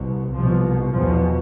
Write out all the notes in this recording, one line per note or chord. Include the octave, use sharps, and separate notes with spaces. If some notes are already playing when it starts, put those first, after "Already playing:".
Already playing: C2 B2
C2 B2 F3
E2 B2 F3